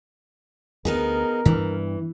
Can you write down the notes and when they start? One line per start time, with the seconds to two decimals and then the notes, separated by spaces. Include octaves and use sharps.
0.85 D2 B3 D#4 G#4 A#4
1.45 G2 E3 D4